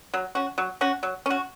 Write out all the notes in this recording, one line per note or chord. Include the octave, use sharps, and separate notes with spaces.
F#3
C#4 F#4
F#3
C#4 F#4
F#3
C#4 F#4